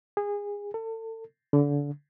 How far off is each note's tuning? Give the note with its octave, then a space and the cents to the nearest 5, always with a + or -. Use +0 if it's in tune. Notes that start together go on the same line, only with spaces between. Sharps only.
G#4 -25
A4 +35
D3 -30